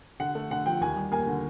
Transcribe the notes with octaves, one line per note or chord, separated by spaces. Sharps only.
D3 F#5
A3
D3 F#5
F3 G5
D#2 G#5
G3
A#3 G#5
D3